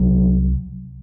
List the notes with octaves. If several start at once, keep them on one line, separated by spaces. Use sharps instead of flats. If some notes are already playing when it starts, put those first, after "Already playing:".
Already playing: C2 C3 F#3